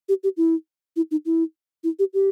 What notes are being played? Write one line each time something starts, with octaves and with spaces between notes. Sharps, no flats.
G4
G4
E4
E4
D#4
E4
E4
G4
G4